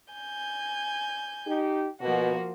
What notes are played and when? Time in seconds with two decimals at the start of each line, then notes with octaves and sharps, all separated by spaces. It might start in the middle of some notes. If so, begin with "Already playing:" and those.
0.13 G#5 G6
1.47 D#4 G4
2.01 B2 F3 A#3 F#4